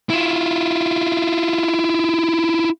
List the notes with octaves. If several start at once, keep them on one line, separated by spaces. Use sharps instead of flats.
E4 F4